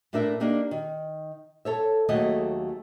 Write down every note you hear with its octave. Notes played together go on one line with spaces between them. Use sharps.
A2 A3 D4 A#4 E5
A#3 D4 D#4 G4
D#3
A4 C#5 E5
D#2 F#3 A3 G#4 D#5 F#5